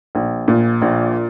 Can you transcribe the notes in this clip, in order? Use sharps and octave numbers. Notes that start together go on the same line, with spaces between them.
A#1
A#2
A#1